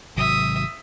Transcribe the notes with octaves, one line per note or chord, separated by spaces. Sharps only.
G#1 C3 F#3 E5 D#6